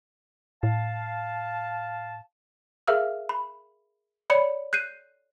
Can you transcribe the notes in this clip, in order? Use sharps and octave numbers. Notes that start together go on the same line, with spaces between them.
A2 F5 A5
G#4 A#4 E5 F5 E6 F6
B5
C#5 D5 B5 C#7
F#6 G6 C7 D#7